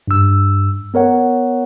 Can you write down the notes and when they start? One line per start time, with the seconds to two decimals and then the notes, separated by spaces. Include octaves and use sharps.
0.08 G2 E6
0.94 B3 A#4 C#5 F#5